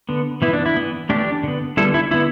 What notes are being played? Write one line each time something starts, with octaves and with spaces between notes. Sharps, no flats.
D3 B3
E3 B3 E4
D4
E4
E3 B3
E3 A3 D4 G4
D3 B3
D3 G3 B3 E4 A4
E4
D3 B3 E4